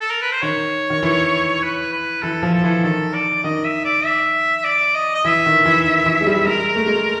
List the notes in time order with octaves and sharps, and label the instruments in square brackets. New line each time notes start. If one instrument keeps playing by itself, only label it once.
[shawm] A4
A#4
B4
C5
[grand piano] D#3 [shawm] C#5
[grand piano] D#3
E3
[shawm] B4
B4
[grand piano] E3 [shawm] A4
[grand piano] F3
[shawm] A4
[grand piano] E3
[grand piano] D#3 [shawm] A4
[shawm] D5
[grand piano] D#3 [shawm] D#5
[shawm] E5
D5
E5
D5
D#5
D#5
[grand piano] E3 [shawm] E5
[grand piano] D#3
E3
D#3
E3
G#3
G3
[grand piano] G#3 [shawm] A#4
[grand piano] A3
G#3
A3